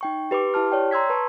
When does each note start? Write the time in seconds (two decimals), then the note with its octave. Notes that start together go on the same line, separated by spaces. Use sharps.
0.01 D#4 G5 C#6
0.31 G4 B4 B5 D6
0.54 E4 G4 A5 F6
0.72 C#5 D5 G5
0.91 A#5 C6 E6 G#6 B6
1.10 B4 A5 C#6